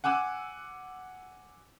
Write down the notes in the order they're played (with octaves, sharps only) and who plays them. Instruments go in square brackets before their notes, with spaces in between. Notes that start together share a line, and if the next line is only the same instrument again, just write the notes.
[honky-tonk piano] F#5 G#5 D6 E6 F#6